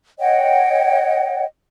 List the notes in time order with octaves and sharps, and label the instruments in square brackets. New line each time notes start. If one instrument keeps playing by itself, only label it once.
[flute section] C#5 D#5 F#5 G5